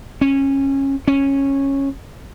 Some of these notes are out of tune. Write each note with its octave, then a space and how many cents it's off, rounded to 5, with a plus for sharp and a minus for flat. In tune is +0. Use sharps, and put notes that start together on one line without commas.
C#4 -20
C#4 -10